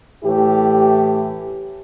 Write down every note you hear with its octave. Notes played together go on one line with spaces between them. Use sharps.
A2 E3 E4 G4